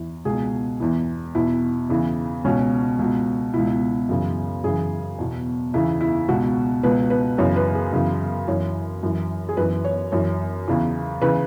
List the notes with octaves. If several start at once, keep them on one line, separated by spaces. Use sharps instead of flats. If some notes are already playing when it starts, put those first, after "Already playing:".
Already playing: E2 E3
C#2 B2 G#4
E2 E3
E2 B2 E4
E2 C#3 E3
C#2 B2 C#4
C#2 B2
C#2 B2 E4
F#2 C#3 E3
F#2 C#3 E3 G#4
E2 B2
E2 C#3 E3 E4
E4
C#2 B2 F#4
C#2 B2 B4
B4
F#2 C#3 E3 C#5
B4
G#4
F#2 C#3 E3
F#2 E3 C#5
F#2 E3
G#4
F#2 E3 B4
C#5
F#2 E3 C#5
E2 C#3 E3
C#3 E3 B4